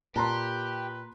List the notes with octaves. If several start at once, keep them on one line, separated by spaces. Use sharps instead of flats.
A#2 G4 B4 A5 A#5 C6